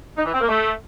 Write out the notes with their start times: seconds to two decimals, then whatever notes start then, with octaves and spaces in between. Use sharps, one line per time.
0.18 D#4
0.25 E3
0.33 C4
0.41 A#3
0.49 A3